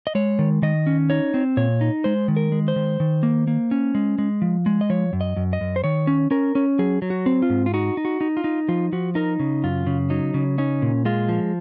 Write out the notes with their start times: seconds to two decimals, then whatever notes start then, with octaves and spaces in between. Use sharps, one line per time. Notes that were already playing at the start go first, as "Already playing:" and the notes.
0.07 D#5
0.15 G#3 C#5
0.39 D#3
0.62 D#3 D#5
0.87 C#4
1.10 D#4 C#5
1.34 C4
1.57 A#2 C#5
1.81 D#4
2.04 G#3 C5
2.28 D#3
2.36 A#4
2.52 G#3
2.68 C5
2.76 D#3
3.00 D#3
3.23 A#3
3.47 A#3
3.71 C#4
3.95 G#3
4.18 G#3
4.42 F3
4.66 G#3
4.81 D#5
4.90 F3 C#5
5.13 F#2
5.21 D#5
5.36 F#2
5.53 D#5
5.61 F#2
5.76 C5
5.84 D#3 C#5
6.07 C#4
6.31 C#4 A#4
6.55 C#4
6.79 F#3 G#4
7.02 F#3
7.10 F#4
7.26 C4
7.42 F4
7.50 G#2
7.66 F4
7.74 D#4 F#4
7.97 D#4
8.05 F#4
8.21 D#4
8.37 F4
8.44 D#4
8.68 F3 F4
8.92 F3 F#4
9.15 D#4 A#4
9.40 C#3
9.64 F#2 F4
9.87 C#3
10.10 F#3 D#4
10.34 C#3
10.58 C#4 D#4
10.82 A#2
11.05 G#3 F4
11.29 F3